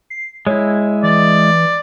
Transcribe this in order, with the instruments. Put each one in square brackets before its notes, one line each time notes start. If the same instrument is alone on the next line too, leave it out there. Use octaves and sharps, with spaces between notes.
[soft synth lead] C7
[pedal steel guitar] G#3 E4 [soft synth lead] C#5
[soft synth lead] E3 [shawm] D5